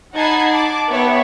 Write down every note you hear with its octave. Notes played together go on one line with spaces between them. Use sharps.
D#4 F#5 A5 B5 G#6 C7
A5 D6
B3 G4 C#5 E5